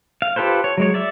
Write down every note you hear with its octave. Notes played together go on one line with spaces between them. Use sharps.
F5
F4 G4 A4 B4 C5
C#5
F#3 G#3 C#5
D5 E5